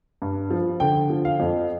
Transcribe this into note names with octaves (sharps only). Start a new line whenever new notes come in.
G2
F3
D3 G5
F3
F5
F2